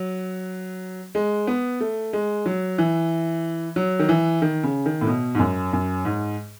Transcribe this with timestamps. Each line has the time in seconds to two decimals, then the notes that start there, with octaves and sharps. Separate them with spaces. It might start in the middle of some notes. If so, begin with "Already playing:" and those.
Already playing: F#3
1.15 G#3
1.47 B3
1.80 A3
2.13 G#3
2.46 F#3
2.78 E3
3.76 F#3
3.99 D#3
4.09 E3
4.42 D#3
4.63 C#3
4.86 D#3
5.01 A2
5.07 B2
5.35 G#2
5.39 F#2
5.73 F#2
6.05 G#2